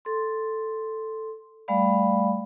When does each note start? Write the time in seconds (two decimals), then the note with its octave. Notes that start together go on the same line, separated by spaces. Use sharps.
0.05 A4 C6
1.68 G3 A3 D5 F5 B5